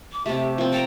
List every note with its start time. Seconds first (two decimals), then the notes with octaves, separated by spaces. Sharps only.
0.12 D6
0.26 C3 A3 G4
0.58 F3 C4
0.73 G5 A5 A#5